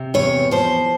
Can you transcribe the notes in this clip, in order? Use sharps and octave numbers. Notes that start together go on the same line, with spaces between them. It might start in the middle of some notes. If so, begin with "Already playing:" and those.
Already playing: C3
E2 C#5
F3 C5